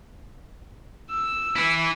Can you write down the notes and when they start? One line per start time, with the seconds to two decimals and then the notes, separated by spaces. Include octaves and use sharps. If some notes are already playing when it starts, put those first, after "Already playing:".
1.10 E6
1.56 E4 B4